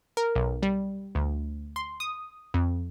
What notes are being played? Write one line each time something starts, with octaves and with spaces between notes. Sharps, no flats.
A#4
B1
G3
D2
C6
D#6
F2